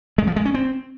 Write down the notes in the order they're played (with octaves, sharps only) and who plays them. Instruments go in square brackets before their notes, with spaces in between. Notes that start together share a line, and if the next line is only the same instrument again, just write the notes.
[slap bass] G#3
F3
G#3
C#4
C4